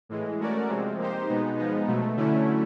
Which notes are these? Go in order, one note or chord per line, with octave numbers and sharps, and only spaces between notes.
A2 E3 G#3
A3 C#4 F#4 A#4 D5
C3 F3 G#3 C4
A#3 D#4 G4 C5
B2 G#3 B3 D#4
F3 G#3 B3 D#4
B2 F#3 A3
D3 F#3 A3 C#4 E4